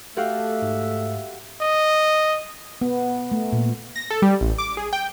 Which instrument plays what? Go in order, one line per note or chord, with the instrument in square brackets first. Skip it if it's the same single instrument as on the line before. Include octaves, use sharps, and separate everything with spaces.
[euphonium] A3 [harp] F#4 G4 F5 [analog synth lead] A4 [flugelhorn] E5
[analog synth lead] G#2
[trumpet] D#5
[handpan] B3
A3
A#2
[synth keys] A#6
A4
G3
A1
D6
G#4
G5